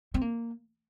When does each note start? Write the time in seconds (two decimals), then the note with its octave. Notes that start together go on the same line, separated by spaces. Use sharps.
0.14 C4
0.21 A#3